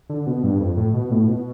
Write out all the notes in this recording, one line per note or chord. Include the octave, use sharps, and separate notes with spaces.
D3
B2
G2
F2
A2
B2
A2
B2